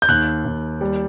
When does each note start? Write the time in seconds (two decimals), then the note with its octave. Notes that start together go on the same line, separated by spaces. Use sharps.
0.02 G6
0.09 D#2 F#6
0.45 D#2
0.81 G3